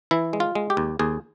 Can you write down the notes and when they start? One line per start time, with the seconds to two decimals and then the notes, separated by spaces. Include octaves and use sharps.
0.11 E3 E4
0.33 G#3
0.40 F4
0.55 G#3
0.70 G4
0.77 D#2
0.99 D#2 G#4